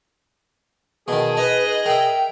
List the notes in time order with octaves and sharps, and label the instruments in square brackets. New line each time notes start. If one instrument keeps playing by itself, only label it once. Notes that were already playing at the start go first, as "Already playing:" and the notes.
[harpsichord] B2 D#3 [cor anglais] G#4 [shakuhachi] A5
[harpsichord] D#4 [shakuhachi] B4 [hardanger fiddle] D#5
[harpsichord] A#4 E5 [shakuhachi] G5